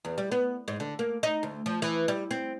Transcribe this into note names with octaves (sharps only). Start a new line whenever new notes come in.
E2
G3
B3
G#2
D3
A#3
D#4
D2
F3
E3
G3
C4